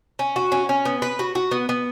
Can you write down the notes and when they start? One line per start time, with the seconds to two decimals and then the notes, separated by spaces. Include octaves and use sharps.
0.19 C#4
0.36 F#4
0.52 C#4
0.69 C#4
0.85 B3
1.02 B4
1.19 F#4
1.35 F#4
1.51 B3
1.69 B3